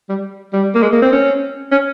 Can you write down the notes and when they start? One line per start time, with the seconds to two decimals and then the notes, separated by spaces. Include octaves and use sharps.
0.09 G3
0.53 G3
0.75 A#3
0.83 G#3
0.93 A#3
1.02 C4
1.13 C#4
1.72 C#4